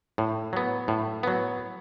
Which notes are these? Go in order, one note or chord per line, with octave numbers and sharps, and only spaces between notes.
A2
F#3 B3
A2
F#3 B3